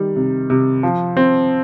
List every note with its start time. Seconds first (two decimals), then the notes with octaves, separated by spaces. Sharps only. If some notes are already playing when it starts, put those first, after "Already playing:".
Already playing: D#3 G3
0.16 C3
0.50 C3
0.83 F3
1.17 C4